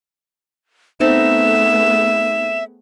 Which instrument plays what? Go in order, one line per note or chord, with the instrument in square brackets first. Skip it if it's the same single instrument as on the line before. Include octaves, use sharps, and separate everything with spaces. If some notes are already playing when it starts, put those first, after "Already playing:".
[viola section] A3 B3 G#4 [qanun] C4 D#4 A5 [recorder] E5 [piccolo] E7